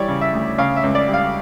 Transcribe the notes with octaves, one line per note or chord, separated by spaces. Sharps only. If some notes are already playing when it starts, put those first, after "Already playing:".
Already playing: E3 G3 C#5 D5
C#3
E5
D2
C#3 F5
E5
C#2
D5
G3
F5